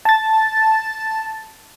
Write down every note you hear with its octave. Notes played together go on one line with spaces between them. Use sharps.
A5 A6